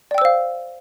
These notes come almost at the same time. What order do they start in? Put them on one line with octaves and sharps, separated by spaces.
D5 G5 E6 C5 F5